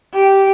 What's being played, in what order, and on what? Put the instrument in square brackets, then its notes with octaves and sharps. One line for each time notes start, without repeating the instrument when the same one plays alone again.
[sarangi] G4